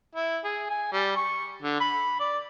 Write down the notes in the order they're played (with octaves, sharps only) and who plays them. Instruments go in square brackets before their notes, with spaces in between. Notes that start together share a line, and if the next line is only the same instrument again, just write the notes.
[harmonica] E4
G#4
G#5
G3
C#6
D3
B5
D5